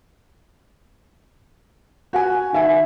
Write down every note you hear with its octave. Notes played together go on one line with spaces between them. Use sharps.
F#4 F#5 G#5
D#3 E5 G#5